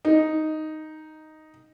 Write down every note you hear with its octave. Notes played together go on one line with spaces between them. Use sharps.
D#4